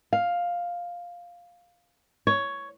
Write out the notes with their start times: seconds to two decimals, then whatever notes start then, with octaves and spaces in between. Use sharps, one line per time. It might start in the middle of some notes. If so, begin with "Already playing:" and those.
0.13 F5
2.27 C#5